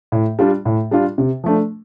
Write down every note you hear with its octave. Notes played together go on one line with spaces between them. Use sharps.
A2
G3 D4 F4
A2
G3 D4 F4
C3
F3 A3 D4